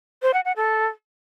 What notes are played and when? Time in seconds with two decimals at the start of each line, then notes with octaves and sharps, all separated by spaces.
0.22 C5
0.34 F#5
0.45 F#5
0.56 A4